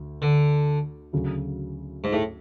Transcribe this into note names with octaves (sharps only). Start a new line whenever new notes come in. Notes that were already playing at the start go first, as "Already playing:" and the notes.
Already playing: D2
D3
D2 C#3 F#3
G#2
A2